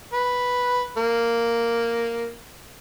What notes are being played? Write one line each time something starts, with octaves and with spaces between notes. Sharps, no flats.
B4
A#3